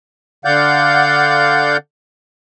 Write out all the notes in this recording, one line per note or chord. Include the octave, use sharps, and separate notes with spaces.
D3 D5 F5 F#5 G6